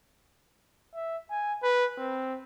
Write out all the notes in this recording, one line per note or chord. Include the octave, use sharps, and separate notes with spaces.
E5
G#5
B4
C4